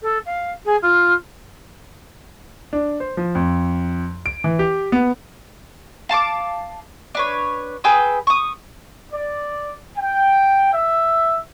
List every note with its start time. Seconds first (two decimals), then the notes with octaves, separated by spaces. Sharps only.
0.01 A4
0.25 F5
0.65 G#4
0.82 F4
2.73 D4
3.00 C5
3.17 F3
3.35 F2
4.26 D7
4.44 E3
4.59 G4
4.92 B3
6.09 F5 A5 C#6 D6
7.15 D4 B4 C#5
7.84 G#4 B4 G5 E6
8.27 C#6 D#6
9.12 D5
9.96 G5
10.73 E5